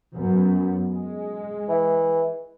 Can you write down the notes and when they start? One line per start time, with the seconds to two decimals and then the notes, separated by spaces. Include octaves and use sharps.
0.14 F#2 B3
0.91 G#3
1.69 E3